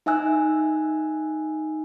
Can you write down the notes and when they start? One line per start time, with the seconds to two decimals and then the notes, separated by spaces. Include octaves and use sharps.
0.06 D#4 E5 G#5 E6 F#6